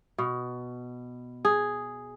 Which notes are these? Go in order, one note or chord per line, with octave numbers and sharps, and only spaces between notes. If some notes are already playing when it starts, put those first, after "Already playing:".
B2
G#4